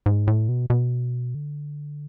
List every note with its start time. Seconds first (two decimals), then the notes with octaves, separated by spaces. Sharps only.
0.06 G#2
0.27 A2
0.49 B2
0.70 B2
1.35 D3